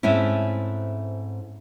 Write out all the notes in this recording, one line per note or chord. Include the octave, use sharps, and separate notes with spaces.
G#2 A3 C4 C#4 E4